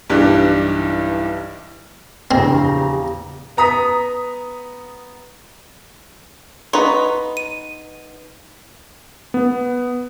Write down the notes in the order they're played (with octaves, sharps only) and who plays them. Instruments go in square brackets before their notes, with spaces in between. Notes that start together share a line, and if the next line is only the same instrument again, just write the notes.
[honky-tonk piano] B1 G2 E3 D4 G4 F#6
[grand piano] A#1 E2 A#6 [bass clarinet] C#3 [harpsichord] C4 [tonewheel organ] G4 A#5
[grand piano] B3 A#5 D#6 B6
[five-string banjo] B3 D#4 B4 [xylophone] A#5 C6 C#6
[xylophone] D#7
[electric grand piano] B3